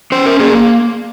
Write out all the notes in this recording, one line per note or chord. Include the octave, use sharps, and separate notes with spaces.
C#4 C5
A#4
A#3 G#4